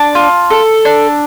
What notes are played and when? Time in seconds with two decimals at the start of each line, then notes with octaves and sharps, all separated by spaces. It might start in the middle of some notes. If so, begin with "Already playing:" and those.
Already playing: D4 A5
0.15 F4
0.50 A4
0.85 D4